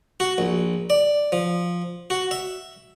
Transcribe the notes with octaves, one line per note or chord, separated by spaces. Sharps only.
F#4
A#1
D5
F3
F#4
E5